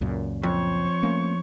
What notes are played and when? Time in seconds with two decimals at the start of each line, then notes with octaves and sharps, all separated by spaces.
0.01 C#2 F#2 A#2
0.43 F2 C5 C#5 C#6
1.03 A3 A#3 C#4